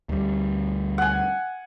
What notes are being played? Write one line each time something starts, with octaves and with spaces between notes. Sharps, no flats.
D2 G3
F#5 G#5